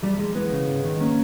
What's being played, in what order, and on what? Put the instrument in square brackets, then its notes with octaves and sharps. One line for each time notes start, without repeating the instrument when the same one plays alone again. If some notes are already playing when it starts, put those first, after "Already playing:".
[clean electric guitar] E2 G3
E2 G#3
E3 G#3 B3
C#3
G#2
D#3
A#3 C#4